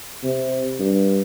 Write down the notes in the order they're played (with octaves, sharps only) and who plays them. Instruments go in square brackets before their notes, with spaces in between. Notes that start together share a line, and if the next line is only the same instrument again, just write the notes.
[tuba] C3
G2